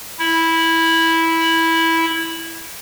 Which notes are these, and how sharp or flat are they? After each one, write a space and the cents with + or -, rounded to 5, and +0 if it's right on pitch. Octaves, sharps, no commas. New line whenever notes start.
E4 -10